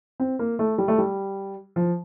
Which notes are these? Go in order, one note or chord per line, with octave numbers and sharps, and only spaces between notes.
C4
A#3
A3
G3
A3
G3
F3